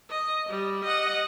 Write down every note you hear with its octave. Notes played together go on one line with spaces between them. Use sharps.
D#5
G3
D#5 F#5